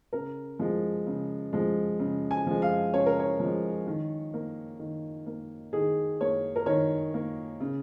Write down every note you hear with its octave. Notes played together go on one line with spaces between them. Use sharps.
C#3 A#4
F3 G#3
C#3
F3 G#3
C#3
G#5
F3 G#3
F5
C#3 C#5
A#4
C#5
F3 G#3
D#3
A#3
D#3
A#3
D#3 G#4
A#3 C#5
A#4
D#3 C#5
A#3
C#3